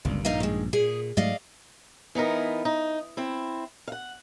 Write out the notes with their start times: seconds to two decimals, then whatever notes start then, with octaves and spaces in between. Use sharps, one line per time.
0.05 G1 C#2 G2 A#2
0.25 A#1 G2 D#4 A#4 F5
0.40 D#3 G#3
0.73 A#2 G#4
1.17 G#2 F#3 A3 D5 D#5 F5
2.15 E3 B3 D#4 A#4
2.65 D#4
3.17 C4 E4
3.88 F5 F#5